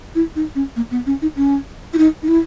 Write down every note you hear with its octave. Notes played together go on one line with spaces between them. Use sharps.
E4
D#4
C#4
A#3
B3
C#4
D#4
C#4
E4
D#4
D#4
E4